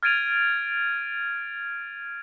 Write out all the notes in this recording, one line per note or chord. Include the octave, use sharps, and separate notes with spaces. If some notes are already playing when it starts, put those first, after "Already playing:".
F6 G#6 A6 D7 D#7 F7